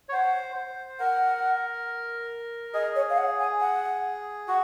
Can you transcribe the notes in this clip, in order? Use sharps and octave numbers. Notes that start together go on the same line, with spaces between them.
C#5
C5 F#5
C5
A#4 F#5
G#4 D#5
C#5
F5
F#5
G#5
F#5
F#4 F#5